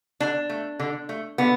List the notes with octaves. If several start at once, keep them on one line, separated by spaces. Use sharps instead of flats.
D3 D4
A3
D3
A3
D3 B3